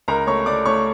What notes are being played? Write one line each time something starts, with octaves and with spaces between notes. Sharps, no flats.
C#2 A#4 A#5
A3 C#5 C#6
A3 D5 D6
A3 C#5 C#6